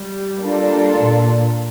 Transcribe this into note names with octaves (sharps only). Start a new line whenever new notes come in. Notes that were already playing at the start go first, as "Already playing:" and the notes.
Already playing: G3
A#3 D4 F4 A4
A#2